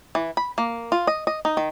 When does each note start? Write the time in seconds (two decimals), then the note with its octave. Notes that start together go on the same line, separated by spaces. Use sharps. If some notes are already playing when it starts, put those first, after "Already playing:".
0.15 E3
0.37 B5
0.58 A#3
0.92 F4
1.07 D#5
1.27 D#5
1.45 D#4
1.57 D#3